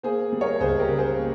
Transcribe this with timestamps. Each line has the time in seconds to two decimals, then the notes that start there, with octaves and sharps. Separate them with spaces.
0.03 A#3 G#4 C5
0.32 G3
0.41 A#4 C#5
0.60 C#2 G#4 C5
0.79 G4 A#4
0.88 C#3
0.97 G#4 C5
1.17 A#3